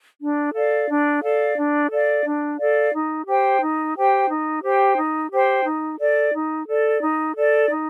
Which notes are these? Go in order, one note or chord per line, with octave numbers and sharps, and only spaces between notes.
D4
A4 D5 F5
D4
A4 D5 F5
D4
A4 D5 F5
D4
A4 D5 F5
D#4
G4 C5 G5
D#4
G4 C5 G5
D#4
G4 C5 G5
D#4
G4 C5 G5
D#4
A4 D5
D#4
A4 D5
D#4
A4 D5
D#4